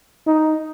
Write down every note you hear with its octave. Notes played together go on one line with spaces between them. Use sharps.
D#4